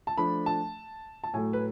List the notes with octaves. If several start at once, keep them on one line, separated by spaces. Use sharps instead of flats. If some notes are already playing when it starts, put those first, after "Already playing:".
A5
F3 A3 D4 B5
A5
A5
A2 F#3 A3 G#5
B4